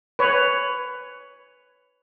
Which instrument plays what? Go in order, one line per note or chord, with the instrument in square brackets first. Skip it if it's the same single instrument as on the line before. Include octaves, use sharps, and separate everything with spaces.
[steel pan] B4 C#5